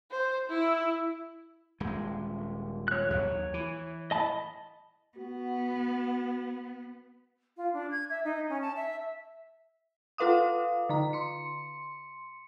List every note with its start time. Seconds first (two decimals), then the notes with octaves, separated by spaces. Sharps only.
0.11 C5
0.49 E4
1.80 D#1 G#3
2.88 C#5 F#6
3.10 D#2 F#3
3.54 E3
4.11 D#5 A5 B5
5.17 B3 F#4
7.56 F4
7.73 D4
7.91 G#6
8.10 E5
8.24 D#4
8.49 C#4
8.61 A5
8.76 E5
10.18 F4 A4 B4 F5 D6 D#6
10.89 D3 A#5
11.13 C6 C#7